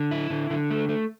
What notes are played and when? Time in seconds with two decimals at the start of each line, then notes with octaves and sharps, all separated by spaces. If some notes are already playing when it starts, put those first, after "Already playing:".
Already playing: D3
0.11 E4
0.30 D3
0.50 D3
0.71 A3
0.89 A3